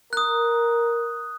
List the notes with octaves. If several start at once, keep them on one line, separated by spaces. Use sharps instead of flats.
A#4 D#6 F#6